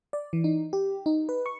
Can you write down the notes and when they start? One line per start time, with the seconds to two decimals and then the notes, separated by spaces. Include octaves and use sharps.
0.13 D5
0.33 E3
0.44 D#4
0.73 G4
1.06 D#4
1.29 B4
1.46 C#6